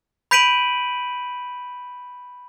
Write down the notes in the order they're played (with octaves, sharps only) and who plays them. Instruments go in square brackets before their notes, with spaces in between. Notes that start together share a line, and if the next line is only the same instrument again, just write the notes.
[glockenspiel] B5 G6 B6 D7 D#7 F#7